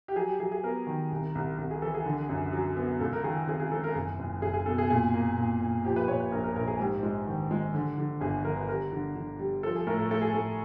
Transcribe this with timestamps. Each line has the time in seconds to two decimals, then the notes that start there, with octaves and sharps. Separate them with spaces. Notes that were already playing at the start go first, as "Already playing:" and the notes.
0.08 G4
0.16 F#3 G#4
0.28 G4
0.39 F#3 G#4
0.52 G#4
0.63 B3 A#4
0.87 D#3
1.12 C2
1.35 C2
1.58 C2
1.71 G#4
1.82 E3 A4
1.94 G#4
2.06 D3
2.29 F#2
2.53 F#3
2.77 B3
3.00 C#2 A4
3.13 A#4
3.24 D#3 G#4
3.47 C3 G#4
3.60 G#4
3.72 C3 A4
3.84 A#4
3.95 F#1 G#4
4.19 F#1
4.42 F#1 G#4
4.54 G#4
4.66 B2 A4
4.78 G#4
4.90 A#2 G#4
5.14 A#3
5.38 A#2
5.60 A#2
5.84 F3 G4
5.96 B4
6.08 A#2 C#5
6.20 B4
6.31 A#1 A#4
6.44 A#4
6.56 A#1 A#4
6.67 G#4
6.79 G#2 G4
7.03 G#3
7.27 D#3
7.51 G#3
7.74 D3
7.98 D3
8.21 G1 G#4
8.44 D3 A#4
8.57 B4
8.69 G3 A#4
8.92 D3
9.16 D3
9.39 G3
9.63 F3 A4
9.75 G#4
9.87 A2 A#4
9.99 A4
10.11 A2 A4
10.21 G#4
10.34 A2 A4